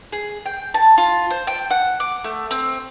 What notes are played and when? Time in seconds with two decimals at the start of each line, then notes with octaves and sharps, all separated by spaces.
0.12 G#4
0.46 G5
0.74 A5
0.98 F4
1.30 C5
1.47 G5
1.70 F#5
2.00 D6
2.24 A3
2.51 C4